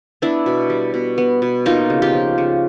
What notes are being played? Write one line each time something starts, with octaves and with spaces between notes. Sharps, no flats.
B3 D4 E4
B2
G3
B2
B3
B2
A#3 D#4 F4
C#3
F4 G4
F3
C#3